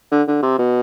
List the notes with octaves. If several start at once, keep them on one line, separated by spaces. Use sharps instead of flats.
D3
D3
C3
B2